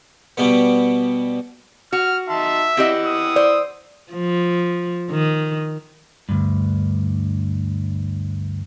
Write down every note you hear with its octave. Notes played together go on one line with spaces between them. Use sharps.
B2 G3 B3
F#4 F6
D#4 E5 A5 C6
E3 C4 G4 D#5 F#5 E6
D#6
C5 D5
F3
D#3
D2 G2